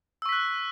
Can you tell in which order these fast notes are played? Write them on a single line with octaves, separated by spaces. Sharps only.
E6 C#6 B6 F#6